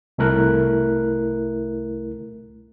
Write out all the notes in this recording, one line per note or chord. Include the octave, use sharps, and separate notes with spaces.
C2 A3 E4 A#4 F#6